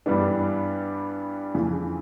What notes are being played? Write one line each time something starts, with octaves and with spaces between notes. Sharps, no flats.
G2 E3 G3 B3 D4
F2 C#3 E3